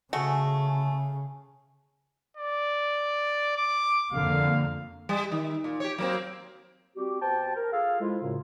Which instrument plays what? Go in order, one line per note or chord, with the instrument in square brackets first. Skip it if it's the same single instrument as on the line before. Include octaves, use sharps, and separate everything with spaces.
[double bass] C#3 [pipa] A3 F#4 [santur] G#4
[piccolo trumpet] D5
D6
[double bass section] F2 D3 A#3 [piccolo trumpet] F5
[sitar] G3
D#3
A#2
G4 C#5
F#3 A#3 C4
[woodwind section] G3 C4 F#4 G4
B2 C5 G5 A5
A#4
F4 G#4 A4 F5
F3 G#3 E4 F4
F#2 A2 C#3